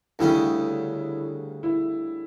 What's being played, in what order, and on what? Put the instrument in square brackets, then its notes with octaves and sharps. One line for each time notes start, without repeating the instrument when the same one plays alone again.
[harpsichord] D2 C#3 G3 C#4 [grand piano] E4
[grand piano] E4